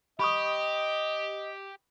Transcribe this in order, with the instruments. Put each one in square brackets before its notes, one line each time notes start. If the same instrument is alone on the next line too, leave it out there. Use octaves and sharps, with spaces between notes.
[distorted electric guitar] G4 [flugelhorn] D#5 [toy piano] B5 C#6 D#6